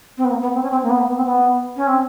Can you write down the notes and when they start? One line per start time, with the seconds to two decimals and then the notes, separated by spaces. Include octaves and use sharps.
0.17 C4
0.24 B3
0.30 A#3
0.41 B3
0.54 C4
0.62 C#4
0.70 C4
0.83 A#3
0.89 B3
0.98 A#3
1.07 B3
1.16 C4
1.25 B3
1.76 C#4
1.87 C4